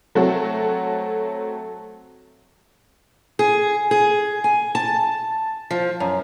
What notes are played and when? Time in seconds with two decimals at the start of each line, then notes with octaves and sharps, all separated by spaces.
0.15 F#3 A3 C4 F#4 A4
3.39 G#4
3.91 G#4
4.44 G#5
4.75 A5
5.71 F3
6.00 F#2